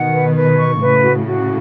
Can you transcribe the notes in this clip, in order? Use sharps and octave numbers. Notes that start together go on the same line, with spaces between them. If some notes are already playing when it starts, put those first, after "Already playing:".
Already playing: B2 D#3 F#5
B4
B4
C#6
A2 C#3 B4
F#4
F#4